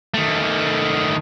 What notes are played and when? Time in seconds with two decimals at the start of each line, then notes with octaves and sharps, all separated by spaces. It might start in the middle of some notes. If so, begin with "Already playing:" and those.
0.14 D#3 A3